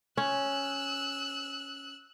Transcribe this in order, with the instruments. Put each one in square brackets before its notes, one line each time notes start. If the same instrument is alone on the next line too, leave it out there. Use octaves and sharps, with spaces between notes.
[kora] C#4 [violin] E6 F#6